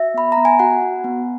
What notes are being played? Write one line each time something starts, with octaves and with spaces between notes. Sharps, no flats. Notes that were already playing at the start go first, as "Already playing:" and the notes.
Already playing: F#4 E5
B3 B5
A#5
B3
G#5
F#4 F#5
F#4
B3